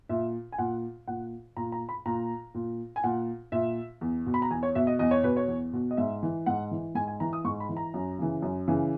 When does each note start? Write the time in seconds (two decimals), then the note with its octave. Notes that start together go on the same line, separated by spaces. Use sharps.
0.09 A#2 E5
0.52 G#5
0.58 A#2 F#5
1.07 A#2 F#5
1.57 A#2 A#5
1.72 A#5
1.89 B5
2.06 A#2 A#5
2.54 A#2
2.96 G#5
3.04 A#2 F#5
3.52 A#2 E5
4.01 E2
4.26 B2
4.34 B5
4.42 A#5
4.51 E2 G#5
4.63 C#5
4.75 B2 E5
4.87 D#5
4.99 E2 D#5
5.11 C#5
5.24 B2 B4
5.36 C#5
5.48 E2
5.73 B2
5.91 D#5
5.97 G#2 E5
6.23 E3
6.46 G#2 F#5
6.71 E3
6.95 G#2 G#5
7.07 G#5
7.20 E3 A#5
7.33 D#6
7.45 G#2 C#6
7.60 B5
7.69 E3
7.77 A#5
7.94 F#2
8.18 C#3 E3
8.42 F#2
8.68 C#3 E3